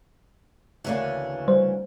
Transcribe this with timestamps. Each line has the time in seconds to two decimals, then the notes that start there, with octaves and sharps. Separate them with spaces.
0.85 D2 C#3 E3 A#3 C#4 D4
1.48 G3 C5